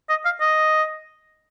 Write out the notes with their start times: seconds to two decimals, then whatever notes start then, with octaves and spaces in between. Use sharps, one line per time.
0.09 D#5
0.25 F5
0.40 D#5